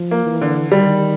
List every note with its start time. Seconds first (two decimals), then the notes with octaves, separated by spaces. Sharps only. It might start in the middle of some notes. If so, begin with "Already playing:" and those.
Already playing: F3
0.11 A#3
0.26 E3
0.41 D3
0.71 D#3 G3